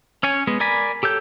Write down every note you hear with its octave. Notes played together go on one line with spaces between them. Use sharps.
C#4 C#5 G#5
G#3 B3
A#4 D5 G#5 B5
G4 A4 C#5 G6